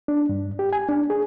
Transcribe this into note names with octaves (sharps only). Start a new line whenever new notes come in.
D4
G2
G4
G#5
D4
G#4